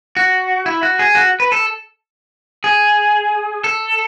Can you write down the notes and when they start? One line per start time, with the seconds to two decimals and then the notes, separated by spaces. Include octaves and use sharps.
0.17 F#4
0.66 E4
0.83 F#4
0.99 G#4
1.15 F#4
1.40 B4
1.52 A4
2.64 G#4
3.64 A4